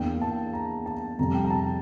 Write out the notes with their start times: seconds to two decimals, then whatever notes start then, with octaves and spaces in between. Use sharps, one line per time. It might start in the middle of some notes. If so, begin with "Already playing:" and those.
Already playing: E2 E3 A#3 D4 G5
0.21 A5
0.53 A#5
0.86 A5
1.19 F2 C3 G3 A#5
1.34 G5
1.45 A#5
1.50 A5